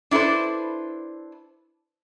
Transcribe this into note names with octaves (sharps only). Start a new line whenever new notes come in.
D4 E4 A4 B4 C5